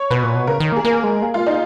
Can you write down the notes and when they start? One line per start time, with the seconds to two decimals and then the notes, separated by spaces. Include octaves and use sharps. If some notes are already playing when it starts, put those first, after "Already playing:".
Already playing: C#5
0.11 B2 B4
0.23 A#2
0.35 B2
0.47 C#3 A#4
0.60 D#3
0.72 A#3
0.76 G#4
0.84 A#3 A#4
1.04 G#3
1.22 A#3 G#4
1.34 G#3 F4
1.40 A#3
1.47 D#4